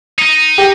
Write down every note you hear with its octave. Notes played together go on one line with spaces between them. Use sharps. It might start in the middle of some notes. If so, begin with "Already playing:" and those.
D#4
G4